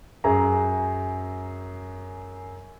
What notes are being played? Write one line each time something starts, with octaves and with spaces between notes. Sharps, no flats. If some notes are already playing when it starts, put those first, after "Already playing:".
F#2 G#4 A#5